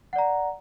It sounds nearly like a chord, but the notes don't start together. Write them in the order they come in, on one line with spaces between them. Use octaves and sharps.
F#5 D5 A#5